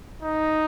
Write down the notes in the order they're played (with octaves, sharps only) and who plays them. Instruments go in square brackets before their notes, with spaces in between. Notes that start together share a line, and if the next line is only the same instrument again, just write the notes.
[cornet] D#4